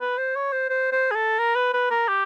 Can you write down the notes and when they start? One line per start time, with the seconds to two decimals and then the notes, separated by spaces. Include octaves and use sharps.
0.01 B4
0.18 C5
0.35 C#5
0.52 C5
0.70 C5
0.92 C5
1.11 G#4
1.16 A4
1.39 A#4
1.55 B4
1.74 B4
1.91 A#4
2.08 G4